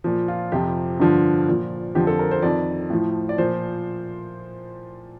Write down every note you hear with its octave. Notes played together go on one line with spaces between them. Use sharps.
A#2 F3
F4
F2 C3 F3 G4
G2 D3 F3
A#2 F3
F2 D3 F3 G4
A4
A#4
C5
F2 D#3 D5
A2 F3
D5
A#2 F3 C5